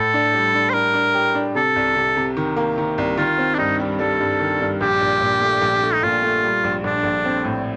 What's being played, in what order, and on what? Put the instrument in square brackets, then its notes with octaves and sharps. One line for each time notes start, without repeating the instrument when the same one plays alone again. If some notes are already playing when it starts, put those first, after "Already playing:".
Already playing: [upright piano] A2 [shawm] A4
[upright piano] D4
G3
D4
[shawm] C5
[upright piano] D4 [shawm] A#4
[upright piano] D4
G4
D4
[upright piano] C3 [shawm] A4
[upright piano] C2
C3
C3
D#3
A#3
D#3
C2
[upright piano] D#3 [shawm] F4
[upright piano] C4
[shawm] D4
[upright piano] G2 [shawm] D#4
[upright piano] G3
[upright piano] G3 [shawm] A4
[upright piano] G2
D#3
G2
[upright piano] A#1 [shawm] G4
[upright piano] A#2
A#2
A3
A#1
A3
[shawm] D#4
[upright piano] A#2 [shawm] F4
[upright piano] A3
G3
A#1
[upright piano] A#1 [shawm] D4
[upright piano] A#1
C4
A2